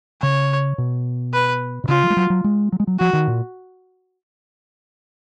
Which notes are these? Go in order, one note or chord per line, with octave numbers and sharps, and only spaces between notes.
C#3 C#5
B2
B4
B2
C#3 F4
F3
G#3
F#3
F#3
G#3
F#3
G#3
F#3
F3 F#4
D#3
A#2